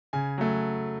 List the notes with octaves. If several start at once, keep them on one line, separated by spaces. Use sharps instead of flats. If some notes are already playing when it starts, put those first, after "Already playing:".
C#3 G#5
F#3 A3